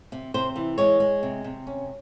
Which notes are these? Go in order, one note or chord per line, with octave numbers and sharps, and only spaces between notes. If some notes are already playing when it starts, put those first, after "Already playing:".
C3
C3 C5
E3
G#3 C#5
G#3
C3
C3
C#4